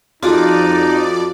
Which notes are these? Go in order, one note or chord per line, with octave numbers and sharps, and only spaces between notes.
F2 D#4 F4 F#4 G#4 D5 A5